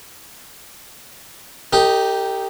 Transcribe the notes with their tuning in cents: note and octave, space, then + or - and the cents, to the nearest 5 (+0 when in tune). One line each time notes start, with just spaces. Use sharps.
D#4 +0 G4 +0 A#4 -45